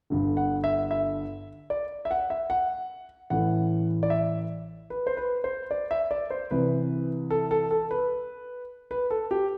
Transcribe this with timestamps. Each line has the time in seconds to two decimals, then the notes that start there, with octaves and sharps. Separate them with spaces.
0.10 G1 G2 D3
0.37 F#5
0.64 E5
0.91 E5
1.70 D5
2.05 E5
2.11 F#5
2.30 E5
2.50 F#5
3.30 A1 A2 E3 F#5
4.03 D5
4.10 E5
4.90 B4
5.07 C5
5.17 B4
5.44 C5
5.71 D5
5.91 E5
6.11 D5
6.30 C5
6.51 C2 C3 E3 B4
7.31 A4
7.51 A4
7.71 A4
7.91 B4
8.91 B4
9.11 A4
9.31 G4